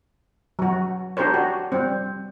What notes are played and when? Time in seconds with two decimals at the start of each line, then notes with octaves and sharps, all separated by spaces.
0.59 F#3 F#4
1.17 D4 G4 A#4 C5 C#5
1.34 F#4
1.72 G3 C4